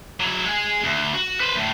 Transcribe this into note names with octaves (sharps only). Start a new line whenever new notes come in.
F#3 E4
G#3 G#4
D2
F#4
B4 C5
D2 A2